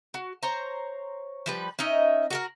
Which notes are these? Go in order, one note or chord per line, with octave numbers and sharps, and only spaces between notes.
F#4
C5 C#5 A#5
F3 G3 B4
C#4 D#4 D#5 E5
F#4 A4 A#4